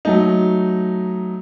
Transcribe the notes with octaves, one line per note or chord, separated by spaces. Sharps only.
F#3 A3 D#4